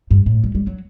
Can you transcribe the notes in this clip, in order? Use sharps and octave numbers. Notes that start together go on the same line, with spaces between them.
G2
A2
G3
G3
F#3